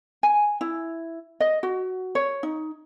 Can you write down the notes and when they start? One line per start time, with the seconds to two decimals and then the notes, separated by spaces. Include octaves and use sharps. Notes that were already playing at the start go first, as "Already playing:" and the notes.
0.23 G#5
0.61 E4
1.40 D#5
1.63 F#4
2.15 C#5
2.43 D#4